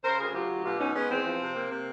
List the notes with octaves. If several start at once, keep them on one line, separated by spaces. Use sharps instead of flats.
C#3 A#4 C5
D2 G#4 A#4
F#3 F4 G4
D2
B2 F4 G4
B3 C#4 D#4
G#3 B3 C#4
E2 C4
F3
C3
A#3
C3